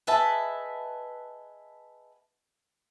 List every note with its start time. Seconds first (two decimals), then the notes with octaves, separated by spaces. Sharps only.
0.07 G#4 B4 D#5 E5 F#5 A5